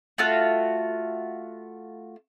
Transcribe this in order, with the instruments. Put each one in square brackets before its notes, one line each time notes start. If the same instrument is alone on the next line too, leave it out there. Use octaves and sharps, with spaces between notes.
[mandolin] A3 F4 F#4